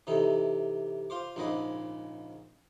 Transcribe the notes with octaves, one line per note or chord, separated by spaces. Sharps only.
C3 E3 D#4 A4
F4 C5 D6
A#1 G#2 C#3 D#5 B5 D6